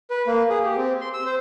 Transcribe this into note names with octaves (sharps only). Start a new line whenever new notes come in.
B4
A#3
G#4
G4
C4
C6
E6
C5